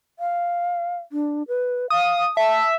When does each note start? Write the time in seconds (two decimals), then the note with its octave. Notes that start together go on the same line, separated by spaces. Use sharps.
0.19 F5
1.12 D4
1.48 B4
1.90 F5 D#6
2.37 E5 A5